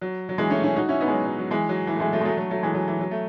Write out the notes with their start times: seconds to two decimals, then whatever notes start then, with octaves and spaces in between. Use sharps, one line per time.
0.01 F#3
0.29 F#3
0.38 E3 G#3
0.50 A3 C#4
0.63 C#4 E4
0.76 D#4 F#4
0.88 C#4 E4
1.00 B3 D#4
1.08 G#3
1.13 F#3
1.26 F#3
1.39 F#3
1.51 E3 G#3
1.69 F#3
1.87 E3
1.95 A3
2.00 E3 G#3
2.13 F#3 A3
2.21 G#3
2.25 F#3 A3
2.37 F#3 A3
2.50 F#3 A3
2.63 E3 G#3
2.74 F#3
2.88 E3
3.01 F#3
3.11 A3